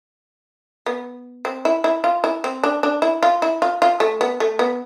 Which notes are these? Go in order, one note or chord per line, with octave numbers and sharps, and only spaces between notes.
B3
C4
E4
E4
F4
E4
C4
D4
D4
E4
F4
E4
F4
F4
A3
B3
A3
B3